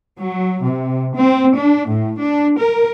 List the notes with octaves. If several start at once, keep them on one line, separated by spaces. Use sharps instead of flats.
F#3
C3
C4
D4
A2
D4
A#4